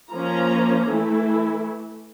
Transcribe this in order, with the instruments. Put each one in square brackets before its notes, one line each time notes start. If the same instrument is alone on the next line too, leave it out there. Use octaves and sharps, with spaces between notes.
[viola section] F3 A#3 C#4 A#5
E3 A3 E4